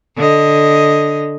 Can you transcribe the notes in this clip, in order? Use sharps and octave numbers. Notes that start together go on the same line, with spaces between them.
D3 D#5